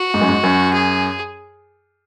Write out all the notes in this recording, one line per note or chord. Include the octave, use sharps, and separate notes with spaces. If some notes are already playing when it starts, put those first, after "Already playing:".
Already playing: F#4
G#2
F#2
G#2
F#2
G#4